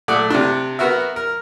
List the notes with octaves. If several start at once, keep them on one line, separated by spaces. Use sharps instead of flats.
A#2 A3 D5 F#5 D#6
C3 D4
B3 F#4 A#4 E5
A#4